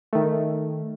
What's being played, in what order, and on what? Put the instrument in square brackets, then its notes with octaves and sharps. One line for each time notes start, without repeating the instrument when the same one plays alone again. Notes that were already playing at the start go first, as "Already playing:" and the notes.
[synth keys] D#3 A3